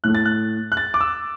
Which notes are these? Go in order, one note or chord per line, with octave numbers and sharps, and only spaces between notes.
A2 A3 F#6
A6
F#6
F#6
A6
D6
E6